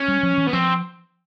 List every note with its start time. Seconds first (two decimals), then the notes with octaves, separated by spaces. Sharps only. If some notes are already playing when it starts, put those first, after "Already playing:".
Already playing: C#4
0.08 G3
0.23 F3
0.38 E3
0.47 B3
0.53 F3 C4